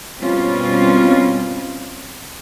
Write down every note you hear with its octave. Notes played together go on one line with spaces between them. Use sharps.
B2 G3 C4 C#4 F4